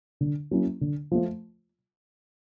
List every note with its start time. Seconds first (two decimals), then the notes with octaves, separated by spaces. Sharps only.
0.21 D3
0.51 F#3 A#3 C#4 E4
0.81 D3
1.11 F3 A3